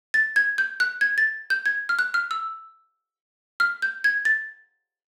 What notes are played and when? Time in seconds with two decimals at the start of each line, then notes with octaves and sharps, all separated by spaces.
0.14 A6
0.36 G#6
0.58 G6
0.80 F#6
1.01 G#6
1.18 A6
1.50 G6
1.66 G#6
1.89 F6
1.99 F#6
2.14 F6
2.31 E6
3.60 F6
3.82 G6
4.04 G#6
4.25 A6